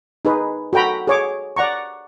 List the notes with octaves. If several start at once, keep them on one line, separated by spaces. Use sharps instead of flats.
D#4 G#4 B4
F#4 A4 G5 A#5 B5
G#4 C#5 D6
D5 F#5 A#5 C#6